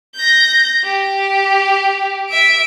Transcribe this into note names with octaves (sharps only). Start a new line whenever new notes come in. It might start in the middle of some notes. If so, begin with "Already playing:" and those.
G6 A#6
G4
E5 D7